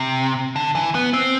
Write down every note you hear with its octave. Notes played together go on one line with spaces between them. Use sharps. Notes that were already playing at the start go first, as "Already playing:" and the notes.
Already playing: C3
D3
E3
B3
C4